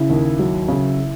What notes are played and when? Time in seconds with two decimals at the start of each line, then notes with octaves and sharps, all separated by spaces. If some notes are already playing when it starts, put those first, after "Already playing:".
Already playing: C#3 E4
0.10 D#2
0.39 F#3
0.68 C#3